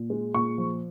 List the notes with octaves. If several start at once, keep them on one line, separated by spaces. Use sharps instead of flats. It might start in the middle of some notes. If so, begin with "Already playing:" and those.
Already playing: A#2
G#3
A#2 C#6
F3